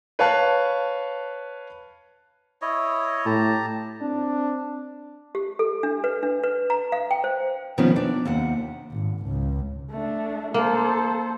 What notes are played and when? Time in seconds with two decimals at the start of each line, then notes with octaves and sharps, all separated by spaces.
0.19 B4 C#5 F5 A5 F#6
2.62 E4 C#5 D#5
3.26 A2 G4 A5 A#5
4.01 C4 D4
5.35 G4
5.59 A4
5.83 D4
6.04 B4
6.23 D4
6.43 B4
6.70 A#5
6.92 F5
7.11 G5
7.24 C5
7.78 B2 D#3 F3 G3 B3 C#4
7.96 D4 D5
8.25 D#2 C3 F#5
8.92 G#1
9.25 C#2
9.91 A3 D4
10.54 A#3 A4 C5